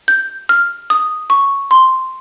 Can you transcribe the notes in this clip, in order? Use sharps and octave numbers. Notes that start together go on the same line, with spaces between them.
G6
F6
D#6
C#6
C6